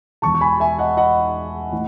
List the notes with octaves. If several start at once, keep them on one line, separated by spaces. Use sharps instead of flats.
E1 E2 B2 A5 C#6
C#6
G#5 B5
E5 G#5
D#5 F#5
D#5 F#5
A2 E3